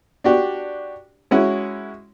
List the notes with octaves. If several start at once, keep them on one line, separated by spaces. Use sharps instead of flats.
D4 F#4 G4
G#3 C#4 E4 F#4